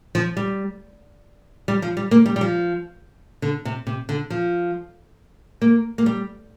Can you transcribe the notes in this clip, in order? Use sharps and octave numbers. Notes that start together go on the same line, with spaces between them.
F3
G3
G3
F3
G3
A#3
G3
G3
F3
D3
C3
C3
D3
F3
A#3
A#3
G3